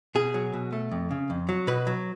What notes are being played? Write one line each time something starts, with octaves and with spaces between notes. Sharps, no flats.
B2 G#4
F#3
B2
A3
F2
C#3
F2
F#3
B2 B4
F#3